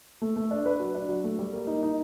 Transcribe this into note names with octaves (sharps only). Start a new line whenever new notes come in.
A3
A3
D4
B4
F#3
D4
F#3
A3
G3
A#3
D#4
D#4